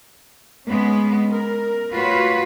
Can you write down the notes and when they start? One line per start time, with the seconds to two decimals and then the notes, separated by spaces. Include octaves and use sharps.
0.66 G#3 B3 C#4
1.30 A#4
1.92 A3 F4 F#4 B4 C#5